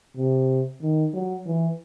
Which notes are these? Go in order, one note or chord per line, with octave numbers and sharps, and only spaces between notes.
C3
D#3
F#3
E3